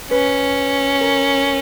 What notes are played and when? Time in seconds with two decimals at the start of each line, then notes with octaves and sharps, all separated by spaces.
0.11 C#4 B4
1.01 A#4